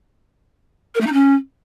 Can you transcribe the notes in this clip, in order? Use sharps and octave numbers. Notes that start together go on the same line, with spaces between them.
A#4
A3
D#4
C#4